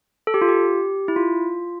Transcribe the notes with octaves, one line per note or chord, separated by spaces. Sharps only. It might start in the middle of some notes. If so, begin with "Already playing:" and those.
A4
G4
F4
G4
E4
F4